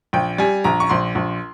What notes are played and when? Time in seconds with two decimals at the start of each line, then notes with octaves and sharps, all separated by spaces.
0.13 A#1 G5
0.38 G3 G#5
0.64 A#1 A#5
0.80 C#6
0.89 A#1 C6
1.15 A#1